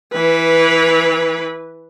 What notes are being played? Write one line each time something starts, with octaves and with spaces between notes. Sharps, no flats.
E3 B4